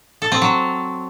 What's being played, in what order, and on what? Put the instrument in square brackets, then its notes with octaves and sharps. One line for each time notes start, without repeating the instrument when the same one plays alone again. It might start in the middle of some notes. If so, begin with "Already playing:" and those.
[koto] A4
C4
F#3